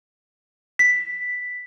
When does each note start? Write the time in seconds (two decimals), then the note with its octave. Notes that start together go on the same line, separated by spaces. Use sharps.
0.79 B6